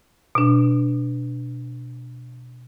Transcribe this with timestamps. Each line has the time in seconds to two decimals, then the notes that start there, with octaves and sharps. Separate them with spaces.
0.35 B2 D4